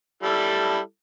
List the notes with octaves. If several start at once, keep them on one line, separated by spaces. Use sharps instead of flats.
G3 E4 A4